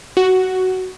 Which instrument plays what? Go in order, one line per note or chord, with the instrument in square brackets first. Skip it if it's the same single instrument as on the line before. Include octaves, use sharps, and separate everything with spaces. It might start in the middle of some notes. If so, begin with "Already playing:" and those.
[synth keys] F#4